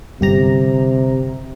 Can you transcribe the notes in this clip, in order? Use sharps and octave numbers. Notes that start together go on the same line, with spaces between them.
G1 C3 G4 A#5